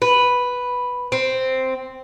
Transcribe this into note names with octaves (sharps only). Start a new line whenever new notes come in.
B4
C4